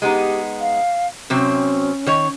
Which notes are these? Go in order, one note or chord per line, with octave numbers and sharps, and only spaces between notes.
G#3 B3 D#4 G4
F5
C3 F#3 C4 C#4
D#3 C#5